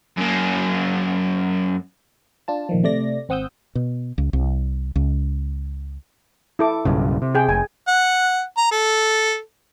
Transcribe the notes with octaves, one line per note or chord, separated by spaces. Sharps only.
F#2 A#3
D4 F4 A5
A#1 D#3 F3
C3 A3 D5 A#6
G#1 C4 F#5 D#6 E6 G6
B2
C#2
C2
C#2
E4 A4 D6
B1 G2 C#3
C3
G#4 G5
F1 G#5
F#5
A#5
A4